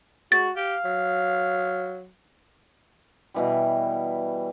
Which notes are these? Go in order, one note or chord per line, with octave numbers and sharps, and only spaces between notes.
G#3 F#4 A6
G4 F5
F#3
B2 E3 G3